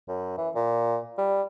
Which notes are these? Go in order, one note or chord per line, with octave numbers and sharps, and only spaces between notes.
F#2
E3
A#2
G3